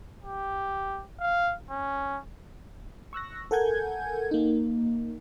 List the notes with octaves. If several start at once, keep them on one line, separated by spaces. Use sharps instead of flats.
G4
F5
C#4
C#6 E6 F#6 A#6
A4 A#4 F#5 G#5 G6 G#6
A#3 D#4